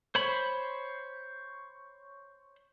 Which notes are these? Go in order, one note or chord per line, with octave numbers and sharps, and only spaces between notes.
C5 C#5 B5